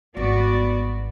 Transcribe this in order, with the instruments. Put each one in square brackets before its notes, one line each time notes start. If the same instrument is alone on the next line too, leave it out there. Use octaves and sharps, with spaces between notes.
[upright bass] G#1 G3 [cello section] B3 F#4 D5